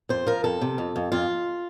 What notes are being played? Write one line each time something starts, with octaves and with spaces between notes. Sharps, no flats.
F2 C5
F3 A#4
F2 A4
C3
F2
F2
F2 F4